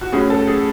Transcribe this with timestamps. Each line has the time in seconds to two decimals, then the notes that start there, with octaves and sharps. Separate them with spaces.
0.01 F#4
0.12 A2 F#3 C#4 G#4
0.30 A4
0.48 G#4